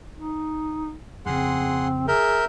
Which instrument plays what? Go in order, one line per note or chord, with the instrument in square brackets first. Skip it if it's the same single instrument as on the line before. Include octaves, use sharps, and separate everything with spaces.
[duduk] D#4
[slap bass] F2 C#3 [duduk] C4 [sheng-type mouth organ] G#4 F#5 C6
[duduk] G#4 [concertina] A#4 [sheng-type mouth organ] E5 G6